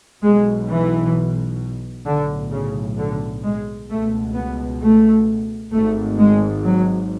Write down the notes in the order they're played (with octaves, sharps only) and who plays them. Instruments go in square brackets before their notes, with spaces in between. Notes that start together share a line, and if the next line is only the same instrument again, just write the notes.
[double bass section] B1 B2 G#3
E3
B1 A2 D3
C#3
D3
G#3
C#2 B2 A3
B3
A3
G#1 G#2 A3
G#3
F#3